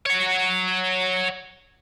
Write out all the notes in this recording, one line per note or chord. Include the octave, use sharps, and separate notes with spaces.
C#5 F#5